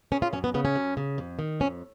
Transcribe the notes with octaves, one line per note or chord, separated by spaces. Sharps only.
C#3 C#4
F4
F#2 C#4
B3
C#3 B3
C#4
F#2
C#3
F2
D#3
F2 C#4